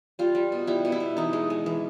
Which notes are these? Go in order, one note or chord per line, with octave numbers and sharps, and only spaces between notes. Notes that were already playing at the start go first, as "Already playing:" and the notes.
G3 F4
G3
B2
G3 E4
B2
E4
B2
E3 D#4
G#3
G#3
E3